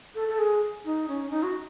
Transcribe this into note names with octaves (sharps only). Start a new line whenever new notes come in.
A4
A4
G#4
D#4
C#4
D#4
F#4